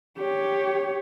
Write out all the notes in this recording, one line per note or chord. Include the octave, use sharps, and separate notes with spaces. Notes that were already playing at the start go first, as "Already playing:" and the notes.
G4 C#5